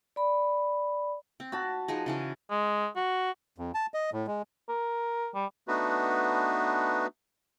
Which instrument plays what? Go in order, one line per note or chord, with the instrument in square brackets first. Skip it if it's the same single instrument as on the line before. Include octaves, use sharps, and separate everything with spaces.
[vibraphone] D5 B5
[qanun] C4
[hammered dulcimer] F#4 A5 [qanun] B5
[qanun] F3 D#4 G#4
C#3 E3 C#4
[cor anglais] G#3
F#4
[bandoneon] F2
A5
D#5
A2
G#3
[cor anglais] A#4
G3
[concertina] A3 B3 D4 D#4 F#4 B4